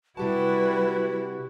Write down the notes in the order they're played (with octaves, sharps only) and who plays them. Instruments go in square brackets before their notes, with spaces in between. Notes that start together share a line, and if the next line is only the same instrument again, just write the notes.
[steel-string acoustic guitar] C3 G4 A5 [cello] G3 E4 [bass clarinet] F#4 [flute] B4